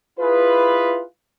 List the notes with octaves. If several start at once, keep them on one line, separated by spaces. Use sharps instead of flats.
E4 F4 G#4 B4